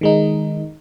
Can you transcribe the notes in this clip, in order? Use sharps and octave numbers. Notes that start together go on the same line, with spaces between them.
D#3 G#3 D#4